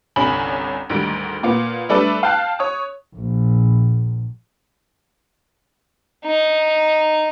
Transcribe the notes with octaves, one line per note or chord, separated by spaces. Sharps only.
G1 C2 C#4 B5 F#7
D2 G#2 D#3 G3 D7
A#2 A#3 B3
G3 A3 D4 A4 B4 D5
F5 G5 A5 F#6
C#5 D#6
A#1
D#4